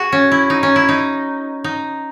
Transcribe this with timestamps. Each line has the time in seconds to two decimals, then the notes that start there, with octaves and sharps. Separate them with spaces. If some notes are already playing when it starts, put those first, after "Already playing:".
Already playing: F#4 G#4
0.12 C#4
0.31 E4
0.50 D#4
0.63 C#4
0.76 E4
0.89 D#4
1.64 D#4